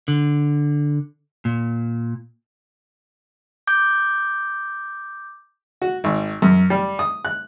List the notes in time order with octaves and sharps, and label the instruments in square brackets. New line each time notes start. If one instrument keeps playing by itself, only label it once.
[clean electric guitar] D3
A#2
[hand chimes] D6 G6
[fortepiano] F#4
G#1
F#2
G3
D#6
F#6